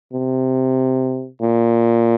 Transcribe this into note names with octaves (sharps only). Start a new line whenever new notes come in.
C3
A#2